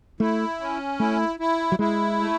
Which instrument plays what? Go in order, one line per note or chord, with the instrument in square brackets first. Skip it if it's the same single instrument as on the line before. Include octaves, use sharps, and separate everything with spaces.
[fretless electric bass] A3 [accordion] E4
[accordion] C#4
[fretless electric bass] A3 [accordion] E4
[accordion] E4
[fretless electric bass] F#3
[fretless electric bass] G#3 [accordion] E4
[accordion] A3